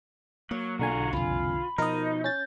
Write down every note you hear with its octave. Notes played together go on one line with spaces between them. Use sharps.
F#3 A#3
B1 D3 F4 F#4 G#5 A#5
C2 F2 F4 B5
B2 F3 D#4 A#4 D#5
C#4 G6 A6